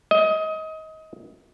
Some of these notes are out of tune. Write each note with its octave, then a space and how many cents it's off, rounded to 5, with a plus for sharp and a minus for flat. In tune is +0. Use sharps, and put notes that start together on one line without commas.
D#5 +25